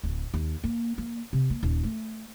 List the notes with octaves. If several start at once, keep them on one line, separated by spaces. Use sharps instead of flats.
D1
D#2
A#3
A#3
C3
A#3
D#1
A3